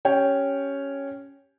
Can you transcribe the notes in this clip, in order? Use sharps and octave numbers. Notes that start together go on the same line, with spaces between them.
C#4 G4 C#5 G5